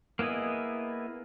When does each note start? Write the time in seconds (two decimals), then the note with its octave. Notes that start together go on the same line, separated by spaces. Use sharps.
0.19 A#3 B3 E4 G#4 D#5